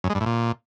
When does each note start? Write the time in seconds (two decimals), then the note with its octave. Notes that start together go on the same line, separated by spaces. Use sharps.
0.04 F#2
0.10 G#3
0.15 G2
0.21 A2
0.26 A#2